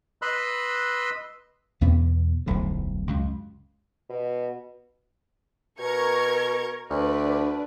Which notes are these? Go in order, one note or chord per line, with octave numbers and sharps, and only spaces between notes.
B4 D#5 B5 C6 E6 F#6
E2 B2 B3
D1 B1 F2 A2
C#2 F#2
B2
B2 A#4 C#6 G#6
D2 D4 B4